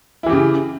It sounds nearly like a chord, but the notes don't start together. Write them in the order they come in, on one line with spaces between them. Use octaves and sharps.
E4 E3 G4 C#3